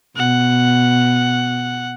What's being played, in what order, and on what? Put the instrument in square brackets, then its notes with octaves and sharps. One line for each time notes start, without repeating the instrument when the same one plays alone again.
[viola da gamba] B2 [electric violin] F#5